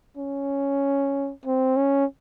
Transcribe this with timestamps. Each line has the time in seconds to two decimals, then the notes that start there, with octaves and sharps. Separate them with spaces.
0.17 C#4
1.45 C4
1.76 C#4